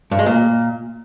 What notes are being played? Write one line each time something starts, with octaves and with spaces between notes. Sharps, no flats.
G2
G#3
A#2